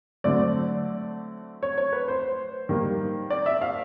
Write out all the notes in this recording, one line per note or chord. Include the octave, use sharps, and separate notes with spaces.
D3 F#3 A3 C4 D5
C#5
C#5
B4
C5
D#3 G3 A#3
D5
E5
F5